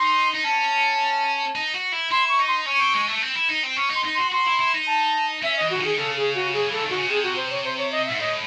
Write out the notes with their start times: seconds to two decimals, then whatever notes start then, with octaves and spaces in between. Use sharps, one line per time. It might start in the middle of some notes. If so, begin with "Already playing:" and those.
Already playing: D#4 C6
0.35 D#4
0.44 C#4 A5
1.56 D#4
1.74 F#4
1.92 E4
2.11 E4 C6
2.29 C#6
2.39 D#4
2.48 C6
2.66 C#4 C#6
2.80 C4
2.94 G#3
3.07 A3
3.22 C4
3.35 E4
3.49 D#4
3.63 C4
3.77 C#4 C#6
3.90 D#4 C6
4.05 D#4
4.14 F#4 C6
4.32 F#4 C6
4.46 E4
4.59 E4
4.74 D#4
4.87 A5
5.43 C#4 E5
5.57 E3 D#5
5.70 C#3 F#4
5.80 D#3 G#4
5.98 C#3 A4
6.17 G#4
6.35 F#4
6.53 F#3 G#4
6.68 E3 A4
6.82 D#3
6.90 F#4
6.96 C#3
7.08 C3 G#4
7.23 F#4
7.36 C5
7.50 C#5
7.64 C5
7.78 C#5
7.91 D#5
8.06 G#2 E5
8.19 A2 D#5